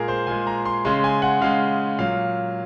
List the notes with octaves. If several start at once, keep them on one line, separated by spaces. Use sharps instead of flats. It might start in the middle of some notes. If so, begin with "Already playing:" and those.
Already playing: A#2 G#3 G#4 A#4
C5
A#2 G#3 G#5
A#5
C6
C#3 G#3 C6
G#5
F#5
C#3 G#3 F5
A#2 F#3 F5